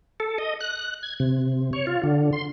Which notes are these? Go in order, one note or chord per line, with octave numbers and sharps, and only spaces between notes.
A4
D#5
F#6
G#6
C3
C#5
F4
D3
C6